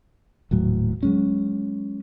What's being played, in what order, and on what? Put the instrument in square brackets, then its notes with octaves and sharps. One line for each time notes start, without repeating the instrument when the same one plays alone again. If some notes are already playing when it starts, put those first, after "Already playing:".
[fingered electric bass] D#1 A2 F#3
F#3 G#3 C#4